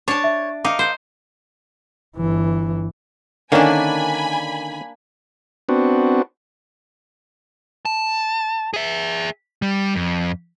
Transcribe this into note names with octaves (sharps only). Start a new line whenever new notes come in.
D4 C#5 A5
E5
D#4 F5 D6
C5
G1 E3
D3 D#3 A#3 C#4 D4 G#5 B5
B3 C4 D4 F#4
A5
G#4 E5
G3
F2